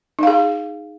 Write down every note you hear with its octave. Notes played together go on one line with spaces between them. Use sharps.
D#4 G#4 F5